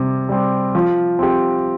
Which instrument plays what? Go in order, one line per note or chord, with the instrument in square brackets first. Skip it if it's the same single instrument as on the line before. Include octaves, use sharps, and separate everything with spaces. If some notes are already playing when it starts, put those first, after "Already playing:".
Already playing: [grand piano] C3 G3 C4
G3 C4
F3
C4 G4